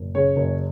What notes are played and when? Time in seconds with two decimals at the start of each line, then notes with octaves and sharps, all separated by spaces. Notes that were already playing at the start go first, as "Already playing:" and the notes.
Already playing: F#1
0.15 C#3 C#5
0.36 F#1